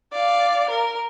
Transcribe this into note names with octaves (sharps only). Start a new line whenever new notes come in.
D5 F5
A#4